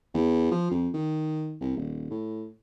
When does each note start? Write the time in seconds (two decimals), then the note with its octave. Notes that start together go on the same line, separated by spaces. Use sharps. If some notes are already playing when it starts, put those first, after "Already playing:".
0.14 E2
0.51 F3
0.71 F2
0.94 D#3
1.61 C2
1.76 D#1
2.10 A2